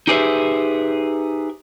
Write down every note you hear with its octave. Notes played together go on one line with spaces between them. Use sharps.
D#4 G4 G#4 B4 C5 E5